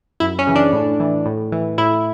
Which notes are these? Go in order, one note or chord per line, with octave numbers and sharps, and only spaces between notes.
F#2 E4
C#4
C#3 E3
D4
A2
E3
A2
E3
A2 E4